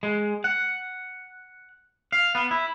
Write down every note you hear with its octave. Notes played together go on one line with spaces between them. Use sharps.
G#3
F#5
F5
B3
E4